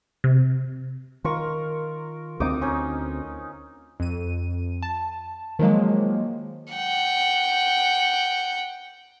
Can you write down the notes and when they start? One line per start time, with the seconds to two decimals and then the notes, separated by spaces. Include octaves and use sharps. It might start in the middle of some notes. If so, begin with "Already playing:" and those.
0.24 C3
1.24 D#3 F4 A#4 C#6
2.40 D2 G3 C4 D#4 D6 D#6
2.62 C#4 D#4
4.00 F2 D#7
4.82 A5
5.59 D#3 F3 F#3 G#3 A#3
6.73 F#5 G5